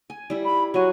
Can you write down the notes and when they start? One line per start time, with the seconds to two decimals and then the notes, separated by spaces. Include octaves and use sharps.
0.10 G#5
0.30 G3 E4
0.45 B5
0.74 F#3 F#4 G#5